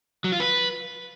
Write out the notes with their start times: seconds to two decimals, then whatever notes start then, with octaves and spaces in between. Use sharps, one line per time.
0.24 F#3
0.32 F4
0.40 B4